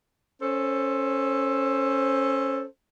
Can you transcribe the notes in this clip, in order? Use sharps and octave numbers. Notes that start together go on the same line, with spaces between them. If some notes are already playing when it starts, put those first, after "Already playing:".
C#4 A4 C5